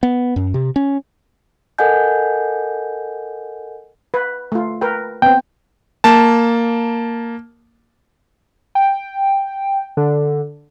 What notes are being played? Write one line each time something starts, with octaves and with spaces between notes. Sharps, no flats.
B3
F#2
C3
C#4
A4 A#4 D#5 F#5 G#5 G6
B4
A3 F4
A#4 B4 G5
B3 C4 G5
A#3 A5
G5
D3